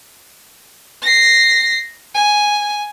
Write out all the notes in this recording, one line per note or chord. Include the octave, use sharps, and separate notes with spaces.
A#6 C7
G#5